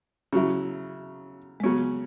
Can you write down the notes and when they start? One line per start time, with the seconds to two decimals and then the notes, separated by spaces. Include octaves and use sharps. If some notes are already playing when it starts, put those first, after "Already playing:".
0.33 C#3 F#3 E4
1.60 G#3
1.64 C#3 F#3 B3 C#4